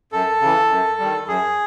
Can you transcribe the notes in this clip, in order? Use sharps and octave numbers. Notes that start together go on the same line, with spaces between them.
F#2 A4
C#3 E3
F#2
D#3 G3
F#2 G#4